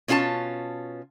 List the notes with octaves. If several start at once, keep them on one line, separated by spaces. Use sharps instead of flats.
B2 C#4 F4 G4 A5